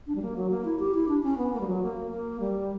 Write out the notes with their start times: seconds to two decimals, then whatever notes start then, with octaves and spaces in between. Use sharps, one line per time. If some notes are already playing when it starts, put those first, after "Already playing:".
0.07 D4
0.15 G3
0.22 A#3
0.37 F#3
0.50 A#3
0.65 E4
0.79 G4
0.94 E4
1.08 D4
1.23 C#4
1.38 B3
1.53 A#3
1.61 G3
1.67 F#3
1.82 A#3
2.11 A#3
2.40 G3